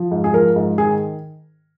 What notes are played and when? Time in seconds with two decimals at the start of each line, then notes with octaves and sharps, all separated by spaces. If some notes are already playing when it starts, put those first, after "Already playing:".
Already playing: F3
0.11 G#2
0.24 G#4
0.33 F3 A#4
0.56 G#2
0.78 D#3 G#4